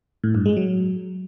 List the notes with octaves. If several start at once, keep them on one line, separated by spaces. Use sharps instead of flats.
A2
G2
G#3
F#3